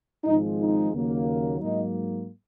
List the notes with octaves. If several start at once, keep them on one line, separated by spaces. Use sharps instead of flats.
G#1 G#2 F3 G#3 D#4
D#4
D#2 C#3 F#3 A#3
G#2 F#3 A#3 D#4